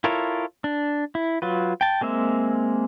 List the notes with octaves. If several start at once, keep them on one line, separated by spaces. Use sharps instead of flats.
E4 F4 A4 A#4 C#5
D4
E4
F#3 F4 B4
G5 A5
G#3 A#3 C4 E5